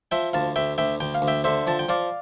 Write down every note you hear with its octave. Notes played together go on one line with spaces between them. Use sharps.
F3 E5 G5
D2 F5 A5
D2 E5 G5
D2 E5 G5
D2 G5
F5
D2
E5 G5
D3 C5 E5
F3 A5
G5
F3 D5 F5